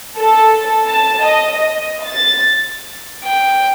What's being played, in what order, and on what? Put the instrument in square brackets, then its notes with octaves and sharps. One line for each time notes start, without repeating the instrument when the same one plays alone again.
[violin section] A4
A5
D#5
D#5
A6
[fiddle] G5